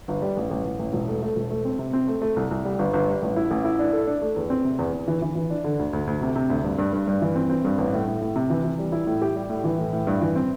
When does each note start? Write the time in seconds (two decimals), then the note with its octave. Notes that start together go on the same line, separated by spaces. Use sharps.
0.08 G1
0.22 G3
0.37 A1
0.51 A1
0.65 A1
0.79 A1
0.93 E1
1.08 A3
1.23 A3
1.36 E1
1.51 A3
1.65 C4
1.79 C3
1.93 C4
2.08 A3
2.22 A3
2.36 C2
2.51 C2
2.65 G3
2.79 G1
2.93 G1
3.08 G3
3.22 A1
3.36 E4
3.51 A1
3.65 E4
3.79 D4
3.93 A4
4.07 D4
4.22 A3
4.36 E2
4.50 C4
4.65 C3
4.79 E2
4.93 E2
5.08 E3
5.22 E3
5.36 E3
5.50 D4
5.64 D3
5.79 D2
5.93 D2
6.07 D2
6.22 C3
6.36 C3
6.50 D2
6.64 G2
6.78 G2
6.93 G2
7.07 G2
7.22 E3
7.35 C4
7.50 C4
7.65 G2
7.78 A1
7.93 A2
8.07 A2
8.21 A2
8.36 C3
8.50 E3
8.64 E3
8.79 G3
8.92 E4
9.07 A2
9.22 G4
9.35 G3
9.50 A2
9.64 E3
9.78 A2
9.93 A2
10.07 G2
10.21 E3
10.36 C4